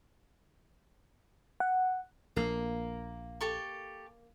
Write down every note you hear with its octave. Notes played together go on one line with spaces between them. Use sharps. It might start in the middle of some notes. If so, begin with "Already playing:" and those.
F#5
A#1 A#3
G4 A4 C#6